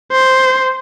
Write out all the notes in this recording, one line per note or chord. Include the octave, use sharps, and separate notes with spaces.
C5